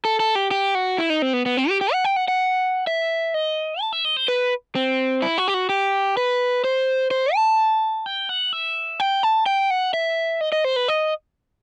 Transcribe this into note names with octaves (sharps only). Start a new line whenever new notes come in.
A4
A4
G4
G4
F#4
E4
D#4
C4
B3
B3
C4
G4
G4
F#5
G5
F#5
F#5
E5
D#5
A5
E5
D#5
C5
B4
C4
E4
F#4
G4
F#4
G4
B4
C5
C5
A5
G5
F#5
E5
G5
A5
G5
F#5
E5
D#5
D#5
C5
B4
D#5